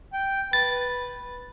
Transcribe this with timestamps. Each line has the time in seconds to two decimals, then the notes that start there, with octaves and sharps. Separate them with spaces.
0.13 G5
0.53 B4 A6